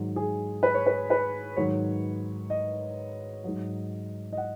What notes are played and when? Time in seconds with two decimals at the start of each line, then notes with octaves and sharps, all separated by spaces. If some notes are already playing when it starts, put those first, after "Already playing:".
Already playing: G#2 D#3 F#3
0.16 G#4
0.63 B4
0.74 C#5
0.86 B4
1.10 B4
1.56 G#2 D#3 F#3 C#5
2.50 D#5
3.44 G#2 F#3
4.33 D#5
4.37 F#5